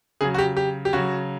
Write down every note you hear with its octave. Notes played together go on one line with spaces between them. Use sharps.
C#3 F#3 G#4
F#4
G4
G4
G4
C#3 F#3 F#4